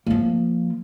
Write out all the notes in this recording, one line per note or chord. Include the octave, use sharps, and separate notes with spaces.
F3 A#3